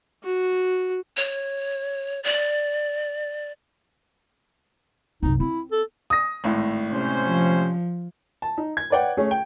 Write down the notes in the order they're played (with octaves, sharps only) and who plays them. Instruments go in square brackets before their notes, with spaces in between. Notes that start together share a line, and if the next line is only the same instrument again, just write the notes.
[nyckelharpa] F#4
[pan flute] C#5
D5
[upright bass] C2 F#2 [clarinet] D#4
[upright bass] C4 [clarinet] E4
[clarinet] A4
[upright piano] D#6 A#6
G#1 A2
[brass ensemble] C3 C#4 C5
[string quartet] F3
[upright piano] A5
D#4
G#6
B4 C#5 D5 F#5 G5
A3 C#4 G#4
G5